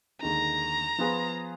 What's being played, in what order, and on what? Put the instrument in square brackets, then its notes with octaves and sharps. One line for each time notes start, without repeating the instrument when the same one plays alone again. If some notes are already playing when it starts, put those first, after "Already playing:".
[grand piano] D#2 D3 G#3 D#4 [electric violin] A#5
[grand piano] F3 B3 F4 G#4 B4